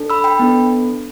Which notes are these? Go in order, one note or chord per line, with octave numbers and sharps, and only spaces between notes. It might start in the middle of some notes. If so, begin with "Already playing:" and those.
Already playing: D4 A4
B5 E6
G5 B5
B3 D4 A4